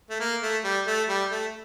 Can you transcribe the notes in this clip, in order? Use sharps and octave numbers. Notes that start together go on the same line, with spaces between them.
A3
A#3
A3
G3
A3
G3
A3